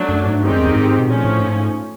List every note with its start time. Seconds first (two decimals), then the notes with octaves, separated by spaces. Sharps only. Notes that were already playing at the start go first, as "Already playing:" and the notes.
Already playing: F#3 A3 D4
0.09 F#2
0.26 G#2
0.41 G2 D#3 G#3 C4 D#4 G4
0.50 F#2
0.58 E2
0.67 F2
0.75 G#2
0.99 B2
1.07 A#2 F3 A3 C#4
1.24 A2
1.40 G#2